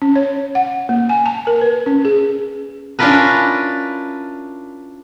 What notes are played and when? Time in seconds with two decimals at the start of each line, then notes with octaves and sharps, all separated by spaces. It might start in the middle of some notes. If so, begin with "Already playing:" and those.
0.02 C#4
0.16 C#5
0.55 F#5
0.89 A#3
1.09 G#5
1.26 A5
1.47 A#4
1.61 B4
1.86 C#4
2.05 G#4
2.99 C#4 D4 E4 F4 A#4 B4